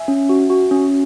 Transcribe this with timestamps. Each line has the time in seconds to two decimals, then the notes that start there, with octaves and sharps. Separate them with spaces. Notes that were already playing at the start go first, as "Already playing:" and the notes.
Already playing: E5 G#5
0.08 C#4
0.29 F#4
0.50 F#4
0.71 C#4